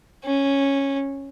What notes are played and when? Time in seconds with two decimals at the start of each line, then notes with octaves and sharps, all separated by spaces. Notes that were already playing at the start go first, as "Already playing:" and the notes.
0.25 C#4